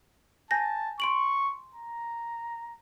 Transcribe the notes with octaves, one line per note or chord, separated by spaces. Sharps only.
G#5 A5 G6 A#6
C6 C#6 D7 F#7
A#5